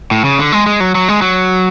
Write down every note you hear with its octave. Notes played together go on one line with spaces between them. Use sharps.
A2
C#3
D3
G#3
G#3
F#3
F#3
G#3
F#3